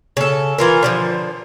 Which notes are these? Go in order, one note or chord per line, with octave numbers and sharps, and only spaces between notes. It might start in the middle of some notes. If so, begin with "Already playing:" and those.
C#3 A4
E3 F4 A#4
D3 D#3 F3